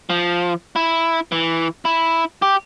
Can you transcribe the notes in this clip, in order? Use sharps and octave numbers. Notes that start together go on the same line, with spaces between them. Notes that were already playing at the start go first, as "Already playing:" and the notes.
F3
E4
E3
E4
G4